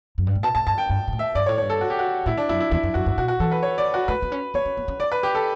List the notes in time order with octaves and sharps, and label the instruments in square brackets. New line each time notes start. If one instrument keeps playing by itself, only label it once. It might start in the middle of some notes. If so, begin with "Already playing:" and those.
[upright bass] F#2
G2
A2
[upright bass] B2 [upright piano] A5
[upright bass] A2 [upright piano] A5
[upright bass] G2 [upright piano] A5
[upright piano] G5
[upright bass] G2
B2
A2
[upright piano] E5
[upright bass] G2 [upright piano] D5
[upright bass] A2 [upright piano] C#5
[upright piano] C#5
[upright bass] G2
[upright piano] A4
F#4
G4
F#4
[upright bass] A2 [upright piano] E4
[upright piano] D4
[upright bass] F#2 [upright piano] E4
[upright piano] E4
[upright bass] E2 [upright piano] E4
[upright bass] F#2
[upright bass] F#2 [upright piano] F#4
[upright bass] G2
[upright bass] B2 [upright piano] F#4
[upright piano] F#4
[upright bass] E3 [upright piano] A4
[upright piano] B4
C#5
D5
F#4
[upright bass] A3 [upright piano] B4
[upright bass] B3
C#4
[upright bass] B3 [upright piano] C#5
[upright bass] C#4
B3
C#4
[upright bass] D4 [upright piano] D5
[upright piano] B4
G4
A4